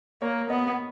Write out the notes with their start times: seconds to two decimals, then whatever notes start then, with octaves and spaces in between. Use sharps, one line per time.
0.22 A#3 C#5
0.49 B3 D#5